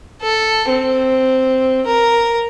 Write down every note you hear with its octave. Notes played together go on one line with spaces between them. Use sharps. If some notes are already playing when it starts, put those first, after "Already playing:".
A4
C4
A#4